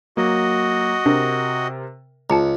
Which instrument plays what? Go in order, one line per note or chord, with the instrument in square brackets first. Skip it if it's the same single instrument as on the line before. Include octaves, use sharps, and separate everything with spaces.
[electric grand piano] F#3 A#3 [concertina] F#4 D#5
[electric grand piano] C3 A#4 [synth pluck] D4
[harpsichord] C#2 [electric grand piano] G#3 C#7 [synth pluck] A5 A#5